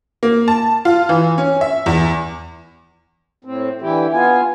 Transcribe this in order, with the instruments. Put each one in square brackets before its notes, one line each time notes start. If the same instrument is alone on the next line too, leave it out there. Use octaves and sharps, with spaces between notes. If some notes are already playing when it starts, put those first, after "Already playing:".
[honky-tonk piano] A#3
A5
F4
E3
C#4
E5
E2
[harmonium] A2 C4
D3 E3 E4 G4
B3 F4 G#5